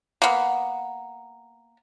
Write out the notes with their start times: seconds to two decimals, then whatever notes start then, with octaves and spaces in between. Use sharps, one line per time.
0.22 A#3 B3